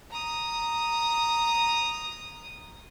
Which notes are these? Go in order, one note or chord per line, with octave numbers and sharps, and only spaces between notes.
A#5 D#6